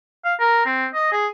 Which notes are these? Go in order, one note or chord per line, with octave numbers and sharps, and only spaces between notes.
F5
A#4
C4
D#5
G#4